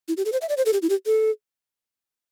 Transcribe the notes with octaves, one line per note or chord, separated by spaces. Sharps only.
E4
G4
A4
C5
E5
D5
C5
A4
G4
E4
G4
A4